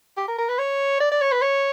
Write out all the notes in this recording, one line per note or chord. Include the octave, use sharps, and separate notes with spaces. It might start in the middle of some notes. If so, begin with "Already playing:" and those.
G4
A#4
A#4
B4
C#5
D5
D5
C#5
B4
C#5